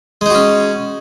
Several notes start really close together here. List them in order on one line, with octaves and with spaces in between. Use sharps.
G#3 D#4 F#4 C#4